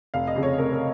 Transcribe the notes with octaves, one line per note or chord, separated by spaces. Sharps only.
F1 F5
D#5
F2 C#3
C#5
F1 A#4
A#4